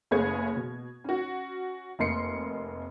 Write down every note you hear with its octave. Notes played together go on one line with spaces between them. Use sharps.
F#1 A3 B3 G#4 C#5 G#6
B2
C#4 F#4
F1 A#3 D#5 C6 C7 C#7